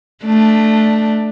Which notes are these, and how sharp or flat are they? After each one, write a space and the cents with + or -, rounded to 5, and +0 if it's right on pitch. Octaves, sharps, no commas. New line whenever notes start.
A3 +0 D4 +10